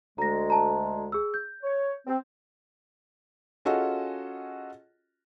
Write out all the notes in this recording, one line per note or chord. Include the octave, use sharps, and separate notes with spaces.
D2 G#3 A#5 A#6
A5 A#5
G#4 E6
G6
C#5
C4
C#4 F4 F#4 G#4 A4 D#5